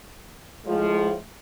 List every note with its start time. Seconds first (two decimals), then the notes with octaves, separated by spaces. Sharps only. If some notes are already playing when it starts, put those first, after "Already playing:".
0.65 A2 F3 G#3